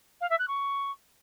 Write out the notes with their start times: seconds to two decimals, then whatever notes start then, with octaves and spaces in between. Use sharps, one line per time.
0.21 F5
0.30 E5
0.39 F#6
0.48 C#6